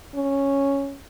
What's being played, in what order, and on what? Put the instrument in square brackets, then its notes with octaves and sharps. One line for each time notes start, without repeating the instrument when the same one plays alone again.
[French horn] C#4